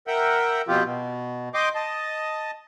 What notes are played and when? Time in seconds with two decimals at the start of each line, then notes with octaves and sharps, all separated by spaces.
0.07 A#4 E5 F#5 G5
0.68 B2 F3 C4 F4 G4
0.84 B2
1.54 D#5 G5 C6 D6
1.75 D#5 A5